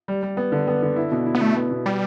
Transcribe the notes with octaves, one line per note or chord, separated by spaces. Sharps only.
G3
G3
B3
D3
B3
D3
E4
B2
E4
B3
B2 A3
B3
B2
G3 B3